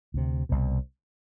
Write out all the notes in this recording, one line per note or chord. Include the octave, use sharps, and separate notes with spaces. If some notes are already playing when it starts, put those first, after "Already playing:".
D2 C3
C2 B2